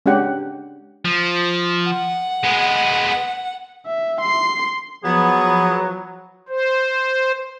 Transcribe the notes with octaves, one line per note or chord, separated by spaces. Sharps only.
G#3 C#4 D4 G4 F#5
F3
F#5
G#3 B3
E5
C6 C7
F3 F#3 B3 G#4
C5